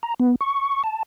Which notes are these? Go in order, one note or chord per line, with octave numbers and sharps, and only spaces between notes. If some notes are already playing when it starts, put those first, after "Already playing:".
A#5
B3
C#6
A5